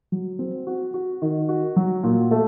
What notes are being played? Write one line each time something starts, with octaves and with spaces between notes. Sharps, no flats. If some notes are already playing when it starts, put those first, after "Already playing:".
F#3
C4
F#4
F#4
D#3
F#4
F#3
A#2
A3